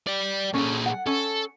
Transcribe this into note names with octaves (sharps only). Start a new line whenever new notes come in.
D5 G5
A#2 C#4 G#4 A4
F#5
C#4 A4